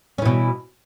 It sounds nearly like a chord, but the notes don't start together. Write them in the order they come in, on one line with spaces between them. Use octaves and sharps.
C#4 E3 B2